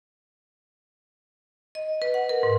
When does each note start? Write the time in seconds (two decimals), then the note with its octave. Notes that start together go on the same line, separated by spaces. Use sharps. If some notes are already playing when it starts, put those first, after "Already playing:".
1.75 D#5
2.02 B4
2.14 F#5
2.29 A#4
2.43 G#2